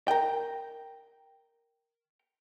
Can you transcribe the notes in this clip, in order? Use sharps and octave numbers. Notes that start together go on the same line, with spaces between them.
A#4 G5